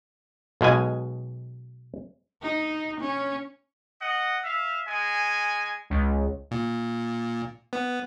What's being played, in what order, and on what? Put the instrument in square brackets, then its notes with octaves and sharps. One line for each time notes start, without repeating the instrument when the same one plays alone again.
[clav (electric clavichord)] B1 B2 G#3 G#5
[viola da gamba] D#4
C#4
[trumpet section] D#5 F#5
E5 F5
G#3 G#5
[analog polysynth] C#2
[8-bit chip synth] A#2
B3